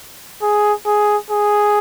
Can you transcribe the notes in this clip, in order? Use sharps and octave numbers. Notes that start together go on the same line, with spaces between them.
G#4
G#4
G#4